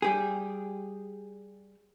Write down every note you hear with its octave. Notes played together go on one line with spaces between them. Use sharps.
G3 G4 G#4